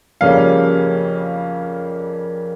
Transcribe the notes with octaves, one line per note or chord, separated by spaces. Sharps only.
F2 C#3 G3 A#3 C#4 F5